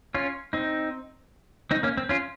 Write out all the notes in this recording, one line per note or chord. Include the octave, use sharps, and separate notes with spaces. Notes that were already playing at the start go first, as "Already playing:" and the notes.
C#4 F4
C4 D#4
C4 D#4
A#3 C#4
C4
C#4 F4